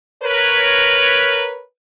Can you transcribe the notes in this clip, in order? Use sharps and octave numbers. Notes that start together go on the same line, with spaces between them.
A#4 B4 C#5